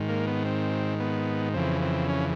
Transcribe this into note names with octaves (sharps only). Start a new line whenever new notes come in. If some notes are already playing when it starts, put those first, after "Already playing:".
Already playing: G#2 D#3
A#3
B3
C4
B3
F2 C#3 E3 C4
C4
C#4